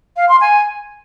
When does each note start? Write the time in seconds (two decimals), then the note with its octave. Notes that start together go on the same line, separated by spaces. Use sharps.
0.17 F5
0.29 C6
0.41 G#5